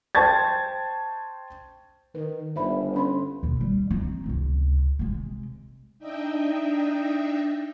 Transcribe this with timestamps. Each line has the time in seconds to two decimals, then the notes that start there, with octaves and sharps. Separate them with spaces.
0.15 C5 G5 A5 C#6 G#6 A6
2.15 D#3 B4
2.56 G1 C5 E5 B5
2.94 C#4 B5 C6
3.43 D#2 B2
3.61 G3
3.91 C4 D#4
4.26 C#2 C3
4.99 C3 G#3
5.99 D4 D#4 D#5 E5 G5